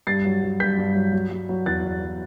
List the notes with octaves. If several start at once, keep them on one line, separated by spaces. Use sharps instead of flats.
G2 A6 C7
F#3
F#3
G2 G6 B6
G2
F#3
F#3
F#3
F#3
E2 F#6 A6
E2
F#3